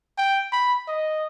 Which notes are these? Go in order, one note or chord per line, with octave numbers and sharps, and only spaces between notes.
G5
B5
D#5